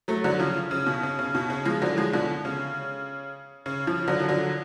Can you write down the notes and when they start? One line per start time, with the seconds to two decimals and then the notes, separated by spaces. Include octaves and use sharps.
0.08 F#3 A3
0.24 D3 F#3
0.39 C#3 F3
0.71 C#3
0.86 B2
1.03 C#3
1.19 C#3
1.35 B2
1.50 C#3
1.65 F3 G#3
1.82 D3 F#3
1.97 F3 G#3
2.13 B2 D3
2.45 C#3
3.66 C#3
3.87 C#3 F3
4.08 D3 F#3
4.20 F3
4.29 D3 F#3